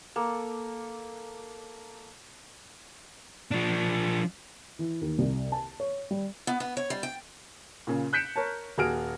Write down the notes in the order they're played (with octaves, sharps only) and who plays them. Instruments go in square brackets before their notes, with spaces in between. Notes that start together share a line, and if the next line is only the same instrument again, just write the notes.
[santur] A#3 A4
[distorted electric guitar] F3 D4
[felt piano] E3
D#2
C2
A5
C#5
G3
[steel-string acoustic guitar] B3
B3
C#5
G3
G5
[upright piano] A#2 C#3
F#6 G6 B6 C#7 D7 E7
A#4 C#5 A5
D#1 F#4 G#4 F6 D7